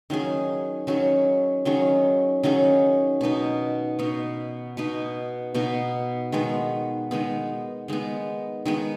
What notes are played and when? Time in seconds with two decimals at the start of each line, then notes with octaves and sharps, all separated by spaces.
0.10 D#3 F#3 C#4 G#4
0.87 D#3 F#3 C#4 G#4
1.65 D#3 F#3 C#4 G#4
2.43 D#3 F#3 C#4 G#4
3.21 B2 B3 D#4
3.99 B2 B3 D#4
4.77 B2 B3 D#4
5.54 B2 B3 D#4
6.32 D#3 G#3 B3
7.11 D#3 G#3 B3
7.88 D#3 G#3 B3
8.65 D#3 G#3 B3